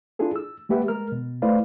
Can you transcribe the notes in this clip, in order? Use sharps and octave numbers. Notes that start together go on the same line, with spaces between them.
D4 E4 F4 G#4 A4
E6
G#3 A#3 G4 B4 E5 F#5
G#3 A#4 F6
B2
A3 E4 B4 C5 D5 F5